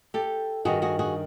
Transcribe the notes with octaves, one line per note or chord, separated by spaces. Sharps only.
G4 A4
G2 D#3 F#4 G#4
F#4 G#4
F#4 G#4